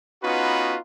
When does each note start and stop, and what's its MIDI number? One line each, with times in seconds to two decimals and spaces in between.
0.23 0.77 59
0.23 0.77 61
0.23 0.77 63
0.23 0.77 65
0.23 0.77 66
0.23 0.77 71